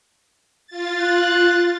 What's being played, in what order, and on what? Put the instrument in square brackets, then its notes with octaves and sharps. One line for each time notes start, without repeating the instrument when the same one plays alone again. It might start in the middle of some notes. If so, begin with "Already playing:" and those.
[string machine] F4 A6
[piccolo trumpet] F#6